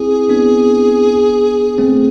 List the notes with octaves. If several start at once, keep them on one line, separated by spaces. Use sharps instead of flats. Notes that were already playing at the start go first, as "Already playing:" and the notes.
Already playing: C4 E4 G#4
B3 D4
A3 C4